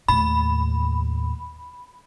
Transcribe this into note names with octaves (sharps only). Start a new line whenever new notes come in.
D#2 A2 B5